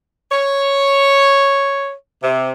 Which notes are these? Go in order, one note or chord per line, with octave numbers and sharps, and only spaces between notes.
C#5
C3